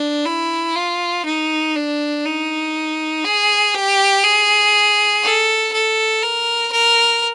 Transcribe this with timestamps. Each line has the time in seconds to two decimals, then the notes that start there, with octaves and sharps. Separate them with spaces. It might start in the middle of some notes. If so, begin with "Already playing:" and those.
Already playing: D4
0.26 E4
0.76 F4
1.25 D#4
1.75 D4
2.25 D#4
3.25 G#4
3.74 G4
4.24 G#4
5.23 A4
5.73 A4
6.23 A#4
6.72 A#4